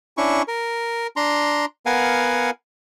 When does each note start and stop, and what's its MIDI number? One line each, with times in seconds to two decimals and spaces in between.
0.17 0.42 61
0.17 0.42 62
0.17 0.42 64
0.17 0.42 85
0.48 1.07 70
1.16 1.65 62
1.16 1.65 82
1.16 1.65 84
1.86 2.50 59
1.86 2.50 70
1.86 2.50 77
1.86 2.50 78
1.86 2.50 80